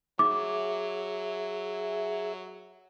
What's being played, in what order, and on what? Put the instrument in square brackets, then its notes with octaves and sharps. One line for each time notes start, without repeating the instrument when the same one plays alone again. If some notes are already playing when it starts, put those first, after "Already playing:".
[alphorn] F#3 [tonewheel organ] G#4 E5 [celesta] D6